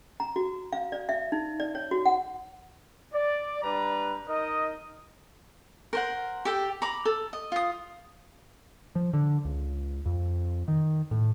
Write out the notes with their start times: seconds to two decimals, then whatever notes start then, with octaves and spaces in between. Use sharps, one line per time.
0.20 A#5
0.36 F#4
0.72 F5
0.92 D5
1.09 E5
1.32 D#4
1.60 D5
1.75 C#5
1.91 F#4
2.06 F#5
3.14 D5
3.63 G3 D4 B4 A#5
4.29 D#4 A#4 D#5
5.93 A#4 C5 F#5
6.45 G4 A4 G5
6.82 A#5 B5 D6
7.05 A4
7.33 D#5
7.52 F4 D#6
8.95 F3
9.14 D3
9.45 C#2
10.06 F2
10.68 D#3
11.11 A2